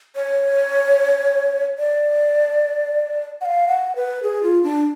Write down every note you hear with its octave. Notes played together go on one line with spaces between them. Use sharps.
C#5
D5
F#5
F5
F#5
B4
G#4
F4
D4